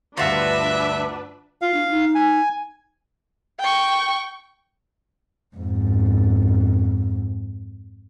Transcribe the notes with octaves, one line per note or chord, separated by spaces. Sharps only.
D2 G2 D4 F4 F#4 B4 E5
F4 F5
D4
D#4
G#5
G5 C#6
F2 G#2